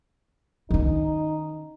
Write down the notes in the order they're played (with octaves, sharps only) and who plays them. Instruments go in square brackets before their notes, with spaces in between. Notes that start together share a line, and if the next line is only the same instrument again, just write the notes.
[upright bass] D#3 C#4 [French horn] D#4